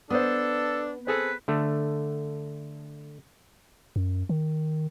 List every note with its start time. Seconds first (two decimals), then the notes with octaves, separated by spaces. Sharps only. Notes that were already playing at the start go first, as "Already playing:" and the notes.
0.10 B3 D4 A4 C5 D#6
1.07 C4 G#4 A4 B4
1.48 D3 A3
3.96 F#2
4.29 D#3